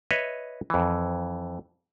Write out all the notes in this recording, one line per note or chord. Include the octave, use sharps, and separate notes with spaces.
B4 C#5 D#5 E5
F2 E3